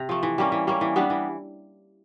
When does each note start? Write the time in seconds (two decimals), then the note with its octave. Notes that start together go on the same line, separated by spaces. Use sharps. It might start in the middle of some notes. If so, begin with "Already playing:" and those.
Already playing: C3
0.09 F3 A3
0.23 E3
0.38 G3 A#3 C#4
0.52 E3
0.67 G3 A#3 C#4
0.81 E3
0.96 G3 B3 D4
1.10 E3